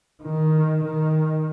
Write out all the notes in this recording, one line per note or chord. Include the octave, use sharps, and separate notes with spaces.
D#3
D#3